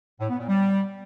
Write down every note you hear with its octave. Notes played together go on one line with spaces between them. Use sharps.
A2
B3
A#2
G3